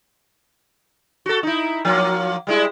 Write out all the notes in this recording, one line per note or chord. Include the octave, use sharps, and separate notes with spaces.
F#4 A4
D#4 E4
F3 F#3 A#3
G3 G#3 E4